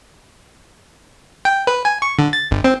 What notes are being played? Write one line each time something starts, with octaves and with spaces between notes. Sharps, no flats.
G5
B4
G#5
C#6
D3
A6
G1
C4